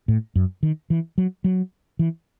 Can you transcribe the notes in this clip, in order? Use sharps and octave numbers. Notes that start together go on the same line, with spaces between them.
A2
F#2
D#3
E3
F#3
F#3
E3